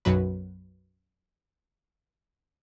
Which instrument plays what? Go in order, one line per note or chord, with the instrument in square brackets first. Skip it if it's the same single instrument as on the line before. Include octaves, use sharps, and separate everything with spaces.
[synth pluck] B1 F#2 F#3 B4